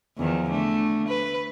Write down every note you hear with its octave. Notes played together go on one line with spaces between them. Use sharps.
E2 D#3 F3
D3 A3
B4